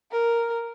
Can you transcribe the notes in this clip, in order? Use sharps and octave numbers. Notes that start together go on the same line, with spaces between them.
A#4